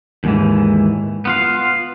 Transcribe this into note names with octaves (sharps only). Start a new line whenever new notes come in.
D#2 G#2 E3
B3 F4 F5